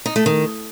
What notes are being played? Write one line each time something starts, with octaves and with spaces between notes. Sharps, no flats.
D#4
A3
D#3